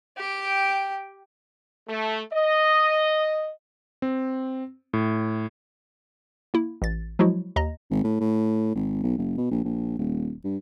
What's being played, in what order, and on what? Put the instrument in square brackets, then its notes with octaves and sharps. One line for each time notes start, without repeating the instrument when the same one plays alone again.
[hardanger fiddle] G4 G5
[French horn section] A3
D#5
[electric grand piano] C4
A2
[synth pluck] A#3 E4
A1 A6
F3 F#3 G#3 E4 F#4
D#2 D#5 A#5 A#6
[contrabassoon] G#1
A2
A2
G#1
B1
F#1
B2
A#1
A#1
D#1
G2